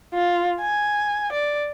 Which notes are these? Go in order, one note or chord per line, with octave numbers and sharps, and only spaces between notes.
F4
G#5
D5